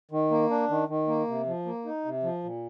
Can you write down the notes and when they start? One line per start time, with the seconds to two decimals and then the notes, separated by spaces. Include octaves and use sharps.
0.11 D#3
0.31 A#3
0.50 D4
0.70 D#3
0.88 D#3
1.07 A#3
1.28 C3
1.46 F3
1.66 A#3
1.85 D#4
2.05 C3
2.23 F3
2.43 A#2